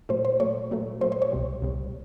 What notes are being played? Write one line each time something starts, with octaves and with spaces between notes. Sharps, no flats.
A#2 F#3 A3 C5
C5
A#2 F#3 A3 C#5
A#2 F#3 A3
A#2 F#3 A3 C5
C5
C#5
C2 B2 G3
C2 B2 G3